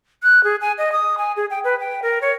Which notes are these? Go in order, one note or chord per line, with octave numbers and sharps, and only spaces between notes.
F#6
G#4
G#5
D#5
D#6
G#5
G#4
G5
B4
G5
A#4
C#5